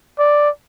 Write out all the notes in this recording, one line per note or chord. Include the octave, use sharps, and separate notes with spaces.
D5